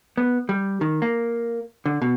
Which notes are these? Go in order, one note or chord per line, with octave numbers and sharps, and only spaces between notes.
B3
G3
D#3
A#3
D3
B2